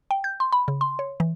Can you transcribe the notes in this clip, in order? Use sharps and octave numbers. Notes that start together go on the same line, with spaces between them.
G5
G6
C6
B5
C#3
C6
C#5
E3